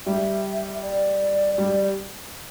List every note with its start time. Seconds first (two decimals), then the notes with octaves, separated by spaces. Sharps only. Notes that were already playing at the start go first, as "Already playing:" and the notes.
0.06 G3 E5
0.82 D5
1.58 G3 D5